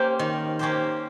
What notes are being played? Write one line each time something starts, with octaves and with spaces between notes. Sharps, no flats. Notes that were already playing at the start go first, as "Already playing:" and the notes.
Already playing: A#3 C#4 G4 C5
D#3
A#3 C#4 G4 C5